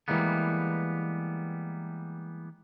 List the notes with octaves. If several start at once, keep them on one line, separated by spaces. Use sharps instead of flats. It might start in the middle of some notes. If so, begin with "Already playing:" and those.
E3 G3 G#3 A#3 B3